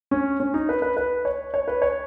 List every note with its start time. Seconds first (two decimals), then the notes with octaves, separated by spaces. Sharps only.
0.11 C#4
0.40 C#4
0.54 D#4
0.69 B4
0.82 B4
0.97 B4
1.25 C#5
1.54 C#5
1.68 B4
1.82 C#5